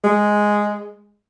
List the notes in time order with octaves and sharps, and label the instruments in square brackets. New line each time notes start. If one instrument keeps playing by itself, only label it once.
[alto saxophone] G#3